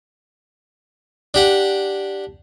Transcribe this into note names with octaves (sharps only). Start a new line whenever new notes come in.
D4 G4 F#5